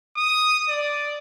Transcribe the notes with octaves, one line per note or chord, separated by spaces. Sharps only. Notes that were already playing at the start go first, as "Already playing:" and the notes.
D#6
D5